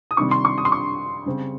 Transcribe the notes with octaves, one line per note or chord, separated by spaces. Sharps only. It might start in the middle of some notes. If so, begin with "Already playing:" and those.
D#6
C3 D#3 G3 C#6
C6
C#6
D#6
C6
C#6
C#3 G3 C4